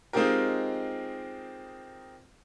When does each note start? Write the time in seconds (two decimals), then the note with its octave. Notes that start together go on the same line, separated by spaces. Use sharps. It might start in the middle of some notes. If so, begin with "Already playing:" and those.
0.13 G#3 C4 D#4 F4 G4 A#4